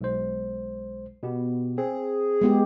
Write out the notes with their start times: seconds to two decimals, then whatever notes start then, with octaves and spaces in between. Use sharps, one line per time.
0.01 B1 G#3 C5
1.23 B2 B3 G4
1.78 C4 G#4
2.41 G#3 B3 G4